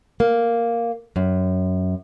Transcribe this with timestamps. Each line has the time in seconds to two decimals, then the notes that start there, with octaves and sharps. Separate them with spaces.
0.20 A#3
1.16 F#2